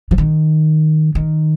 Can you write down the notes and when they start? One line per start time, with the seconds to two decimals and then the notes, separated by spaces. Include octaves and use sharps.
0.11 F3
0.18 D#3
1.15 D#3